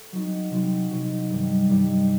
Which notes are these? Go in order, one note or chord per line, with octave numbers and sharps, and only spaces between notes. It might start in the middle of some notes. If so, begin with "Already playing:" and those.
Already playing: A4
F#3 C4 D#4
C3 F#3 C4 D#4
C3 F#3 C4 D#4
G2 D#3 G3
G2 D#3 G3